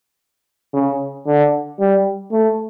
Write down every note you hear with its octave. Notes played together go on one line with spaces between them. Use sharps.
C#3
D3
G3
A3